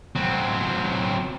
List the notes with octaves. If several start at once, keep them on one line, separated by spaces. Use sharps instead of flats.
F#3 C4